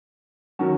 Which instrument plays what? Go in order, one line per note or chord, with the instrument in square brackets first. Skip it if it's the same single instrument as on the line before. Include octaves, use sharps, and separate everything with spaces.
[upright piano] D#3 F#3 C#4 F#4